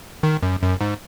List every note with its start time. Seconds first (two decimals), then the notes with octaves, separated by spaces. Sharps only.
0.23 D#3
0.43 F#2
0.62 F#2
0.81 G#2